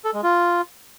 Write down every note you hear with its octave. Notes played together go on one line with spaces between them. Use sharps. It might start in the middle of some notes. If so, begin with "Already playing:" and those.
A4
G#3
F4